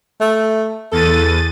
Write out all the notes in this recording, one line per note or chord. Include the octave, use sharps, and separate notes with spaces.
A3
E2 A4 A6 D#7